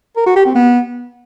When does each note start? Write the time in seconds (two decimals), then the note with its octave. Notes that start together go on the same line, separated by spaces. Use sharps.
0.17 A#4
0.26 F#4
0.36 G4
0.46 C4
0.55 B3